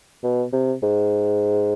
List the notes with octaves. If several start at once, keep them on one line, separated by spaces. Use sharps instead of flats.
B2
C3
G#2